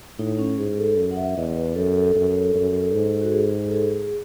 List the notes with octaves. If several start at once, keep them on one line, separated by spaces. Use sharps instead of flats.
A2 D#4
C#4
G#2 G#4
A4
F#2
F#5
E5
E2 D#5
B4
F#2 A4
F#2
F#2
G#2
F#4
G#4
A4
G#4